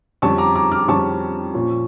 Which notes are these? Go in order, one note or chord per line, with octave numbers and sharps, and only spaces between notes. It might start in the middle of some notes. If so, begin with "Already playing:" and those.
F2 D3 G3 C#4 A5 C#6
A#5 D6
A#5 D6
D6 F6
F2 D3 G3 C#4 A5 C#6
A#2 F3 C#4